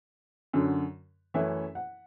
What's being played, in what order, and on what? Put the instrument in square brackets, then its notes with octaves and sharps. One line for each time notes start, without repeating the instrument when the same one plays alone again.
[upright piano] F#2 D3 F#3
F#2 E3 A3 C#4 E4 E5
F#5